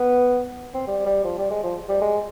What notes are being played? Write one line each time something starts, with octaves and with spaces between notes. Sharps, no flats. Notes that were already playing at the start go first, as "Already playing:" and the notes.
Already playing: B3
C4
G3
G3
F3
G3
G#3
F3
G3
G#3